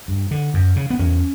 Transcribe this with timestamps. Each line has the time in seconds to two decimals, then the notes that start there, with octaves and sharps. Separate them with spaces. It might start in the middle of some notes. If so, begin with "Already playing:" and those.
0.08 G2
0.31 D3
0.54 F#2
0.76 C#3
0.90 B3
0.99 E2 C#4